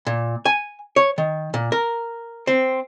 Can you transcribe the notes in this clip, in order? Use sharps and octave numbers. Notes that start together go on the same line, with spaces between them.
A#2
G#5
C#5
D#3
A#2
A#4
C4